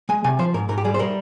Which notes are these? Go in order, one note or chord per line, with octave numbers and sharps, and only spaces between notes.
G#3 G#5
C3 G#5
F3 C5
G#2 A#4
G#2 A#4
G4
G3 G#4
C5
G3 A#4